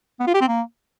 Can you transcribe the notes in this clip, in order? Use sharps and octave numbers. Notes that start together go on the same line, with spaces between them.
B3
F4
G4
C4
A#3